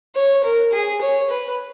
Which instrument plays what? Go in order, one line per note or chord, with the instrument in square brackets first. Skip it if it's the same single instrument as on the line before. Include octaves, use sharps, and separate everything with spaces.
[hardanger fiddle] C#5
A#4
G#4
C#5
B4